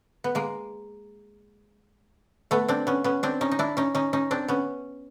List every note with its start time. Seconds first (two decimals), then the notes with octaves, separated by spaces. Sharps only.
0.24 B3
0.35 G#3 A#3
2.51 A3 B3
2.68 C4 D4
2.87 B3 C#4
3.04 B3 C#4
3.23 C4 D4
3.41 C#4 D#4
3.51 D#4
3.59 D4 E4
3.77 C#4 D#4
3.95 C#4 D#4
4.13 C#4 D#4
4.31 C4 D4
4.48 B3 C#4